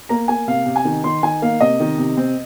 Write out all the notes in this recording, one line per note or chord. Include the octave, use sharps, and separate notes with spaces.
A#3 A#5
A#3 G#5
C3 F5
C3
G#5
D#3
D#3 C6
D#3 G#5
A#3 F5
C3 D#5
D#3
C3
C4